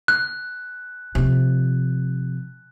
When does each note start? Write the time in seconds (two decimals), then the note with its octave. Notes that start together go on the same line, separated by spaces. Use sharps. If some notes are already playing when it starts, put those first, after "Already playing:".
0.08 F#6
1.15 C3 F3